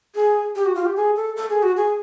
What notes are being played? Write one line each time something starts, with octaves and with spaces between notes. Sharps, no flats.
G#4
G4
F#4
F4
G4
G#4
A4
A4
G#4
F#4
G#4